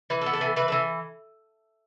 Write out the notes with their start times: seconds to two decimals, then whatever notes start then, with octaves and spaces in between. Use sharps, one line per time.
0.10 E3 B4
0.22 A4
0.26 B3
0.33 A4
0.41 E3
0.56 E3 B4
0.68 E3 A4